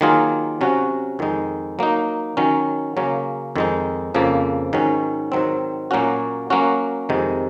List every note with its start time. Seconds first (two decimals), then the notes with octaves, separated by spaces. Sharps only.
0.01 D#3 F#3 A#3 F4 G#4
0.61 C3 F#3 C#4 F#4
1.19 F2 D#3 G#3 D#4
1.79 F#3 A#3 D#4
2.37 D#3 F#3 C#4
2.97 C#3 F#3 A#3 C#4
3.56 F2 D#3 G#3 D#4
4.15 F2 C#3 F3 A#3
4.73 G#2 D#3 F#3 C#4
5.32 G#2 D#3 F#3 C4
5.91 A#2 F#3 A#3 C#4 F#4
6.50 F#3 A#3 C#4 F#4
7.09 F2 C3 D#3 G#3 D#4